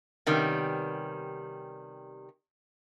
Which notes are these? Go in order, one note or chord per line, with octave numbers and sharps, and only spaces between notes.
C3 D#3 G3 B3 C#4